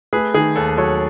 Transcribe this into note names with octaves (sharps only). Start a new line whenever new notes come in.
A3 G#4 B4
D#3 G#4
D#2 A4
F#3 A4 C#5